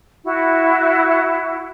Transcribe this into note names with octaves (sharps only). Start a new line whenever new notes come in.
E4 F#4